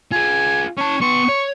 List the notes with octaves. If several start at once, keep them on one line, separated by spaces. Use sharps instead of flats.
F4 G#4 G#5
C#4 C#5 A5
B3 C6 C#6
C#5